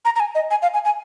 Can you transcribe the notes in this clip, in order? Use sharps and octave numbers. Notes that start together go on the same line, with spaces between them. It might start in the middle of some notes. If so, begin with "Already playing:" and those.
A#5
A#5
G#5
D#5
G#5
F5
G#5
G#5